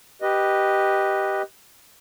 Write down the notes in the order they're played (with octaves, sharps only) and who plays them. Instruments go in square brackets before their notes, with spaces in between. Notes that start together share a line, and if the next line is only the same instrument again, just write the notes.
[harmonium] G4 B4 D#5